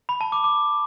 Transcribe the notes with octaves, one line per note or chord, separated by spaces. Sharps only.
B5
A5
D6
D6